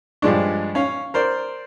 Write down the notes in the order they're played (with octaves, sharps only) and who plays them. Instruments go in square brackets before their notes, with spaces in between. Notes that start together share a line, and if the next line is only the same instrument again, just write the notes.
[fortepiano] G2 F3 G#3 D4
C#4 F5
A#4 C5 D5